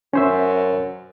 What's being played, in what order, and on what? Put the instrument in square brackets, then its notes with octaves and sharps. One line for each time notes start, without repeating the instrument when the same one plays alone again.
[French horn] F#2 [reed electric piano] C#4 C5 E5